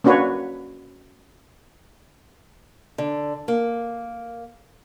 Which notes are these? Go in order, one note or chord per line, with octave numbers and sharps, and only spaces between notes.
A#3 C#4 D4 F#4 B4 C#5
D3
A#3